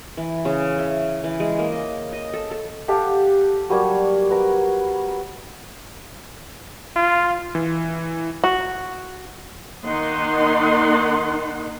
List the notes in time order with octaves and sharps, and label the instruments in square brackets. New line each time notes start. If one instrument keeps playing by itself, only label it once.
[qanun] E3
C#3
E5
E3
G#3
A#3
D#5
D#5
A4
A4
[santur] G4 A4 F5 F#5
F#3 G3 A#3 C#5
B3 A#4
[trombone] F4
[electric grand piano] E3
[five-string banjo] F#4
[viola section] D#3 A#3 D#4 D#5 F#5 C6